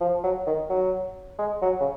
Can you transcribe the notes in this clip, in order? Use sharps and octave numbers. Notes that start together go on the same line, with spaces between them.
F3
F#3
D#3
F#3
G#3
F#3
C#3